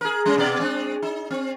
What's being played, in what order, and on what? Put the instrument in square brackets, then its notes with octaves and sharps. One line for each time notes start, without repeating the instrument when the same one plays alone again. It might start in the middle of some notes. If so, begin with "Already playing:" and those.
[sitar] G#4 A#4
G3 C#4
B2 B3 D5
G#3 C4 D4
D#4
C4